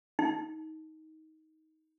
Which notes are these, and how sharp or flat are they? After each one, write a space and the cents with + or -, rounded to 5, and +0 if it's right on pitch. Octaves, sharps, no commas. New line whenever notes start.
D#4 +20